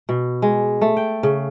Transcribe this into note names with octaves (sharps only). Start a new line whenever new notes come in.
B2
G#3
A3
G5
C#3